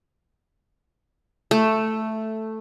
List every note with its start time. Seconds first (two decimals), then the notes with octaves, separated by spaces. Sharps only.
1.51 A3